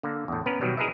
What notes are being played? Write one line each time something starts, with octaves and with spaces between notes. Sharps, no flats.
D3 A#3
E2 A2
B3 C#4 A#4 B4
B2 D#3 F#3 G3
E4 G#4 A#4 B4 D#5 E5